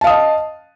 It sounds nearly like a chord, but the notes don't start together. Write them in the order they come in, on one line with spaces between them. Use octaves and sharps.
A5 F5 D#6 D#5